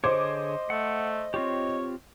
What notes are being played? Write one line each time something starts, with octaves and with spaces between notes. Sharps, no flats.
D3 G#4 C5 C#5 D#5 D6
A3 F#5
C4 F4 G4 C#5